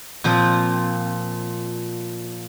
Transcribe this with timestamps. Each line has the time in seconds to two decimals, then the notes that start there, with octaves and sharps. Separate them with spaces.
0.24 A#2 F3 C4